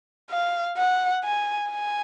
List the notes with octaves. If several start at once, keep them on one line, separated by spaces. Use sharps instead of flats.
F5
F#5
G#5
G#5